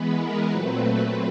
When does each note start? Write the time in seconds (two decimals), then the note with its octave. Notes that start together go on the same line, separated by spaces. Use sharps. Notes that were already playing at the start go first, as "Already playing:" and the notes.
Already playing: E3 G#3 B3 B4
0.19 A#4
0.49 A#2 F#3 A3 C4 B4